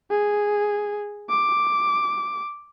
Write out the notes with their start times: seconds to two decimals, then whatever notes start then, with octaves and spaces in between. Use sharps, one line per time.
0.11 G#4
1.30 D6